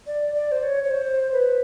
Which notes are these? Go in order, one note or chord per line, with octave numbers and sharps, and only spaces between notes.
D5
D5
C5
C#5
C#5
C5
B4